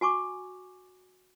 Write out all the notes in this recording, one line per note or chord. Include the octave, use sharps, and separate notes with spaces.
F#4 G#5 C#6 D6